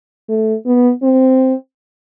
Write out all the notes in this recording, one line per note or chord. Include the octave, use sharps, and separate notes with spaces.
A3
B3
C4